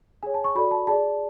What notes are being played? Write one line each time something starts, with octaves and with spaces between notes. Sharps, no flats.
G#4 C#5 G#5
A5
C#6
F#4 A4 D5 B5
A5
G#4 D5 A5